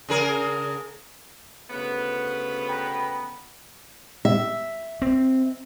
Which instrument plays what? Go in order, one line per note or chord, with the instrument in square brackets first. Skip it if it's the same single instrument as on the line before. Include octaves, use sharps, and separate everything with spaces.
[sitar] C#3 G#4 A#4
[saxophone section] D2 C#3 B3
[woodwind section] G5 A#5 B5
[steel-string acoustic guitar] E5
[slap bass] C4